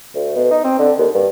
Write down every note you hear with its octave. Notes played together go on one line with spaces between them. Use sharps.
D2
B2
D#4
C4
D3
D#2
G2